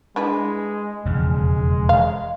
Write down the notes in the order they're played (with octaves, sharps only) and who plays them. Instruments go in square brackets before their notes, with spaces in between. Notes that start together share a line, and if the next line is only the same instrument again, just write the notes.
[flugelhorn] G#3 [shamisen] D4 E4 B4
[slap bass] E1 F2 C#3 [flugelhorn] G#3
[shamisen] F5